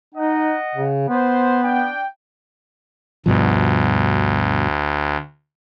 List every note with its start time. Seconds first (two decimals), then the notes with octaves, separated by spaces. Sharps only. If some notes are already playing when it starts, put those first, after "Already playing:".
0.15 D#4 D#5 F#5
0.75 C#3
1.09 B3 C5
1.62 D4 G5
3.26 D2 G2 B2 F3